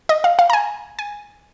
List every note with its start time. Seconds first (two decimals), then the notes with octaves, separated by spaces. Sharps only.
0.09 D#5
0.24 F5
0.39 F5
0.50 A#5
0.53 G#5
0.99 G#5